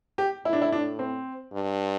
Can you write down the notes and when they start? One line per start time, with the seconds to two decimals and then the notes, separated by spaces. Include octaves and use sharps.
0.18 G4
0.45 A2 E4
0.53 D4
0.62 E4
0.72 D4
0.99 C4
1.52 G2